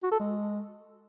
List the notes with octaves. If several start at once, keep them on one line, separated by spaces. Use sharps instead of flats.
F#4
A4
G#3